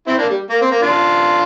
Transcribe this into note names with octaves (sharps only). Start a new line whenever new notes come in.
C4 E4
A#3 D4
G3
A#3
C4
A#3
D4 F4